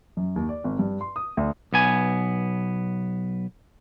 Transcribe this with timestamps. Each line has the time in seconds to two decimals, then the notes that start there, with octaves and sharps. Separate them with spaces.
0.17 F#2
0.36 D#2
0.49 D5
0.64 G#1
0.79 G2
1.01 C6
1.16 D#6
1.37 D2
1.73 B1 B3 G#5